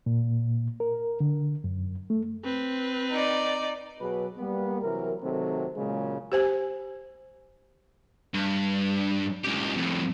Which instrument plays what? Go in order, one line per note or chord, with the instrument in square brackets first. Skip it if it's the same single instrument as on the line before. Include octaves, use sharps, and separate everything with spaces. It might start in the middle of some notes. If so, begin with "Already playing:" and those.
[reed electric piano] A#2
A#4
D3
F#2
A3
[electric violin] C4 B4
[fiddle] D#4 D5
[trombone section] B2 F#3 G#4 B4
G3 A#3 B3
C3 E3 F#3 A#4
C3 D#3 F#3 A3 C4 A4
A#2 C#3 F#3 G#3
[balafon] G4 C5 G#5
[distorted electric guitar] G2
C#2 G4
F2 A2